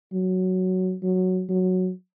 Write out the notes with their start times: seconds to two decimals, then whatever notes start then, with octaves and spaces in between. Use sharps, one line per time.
0.13 F#3
1.03 F#3
1.49 F#3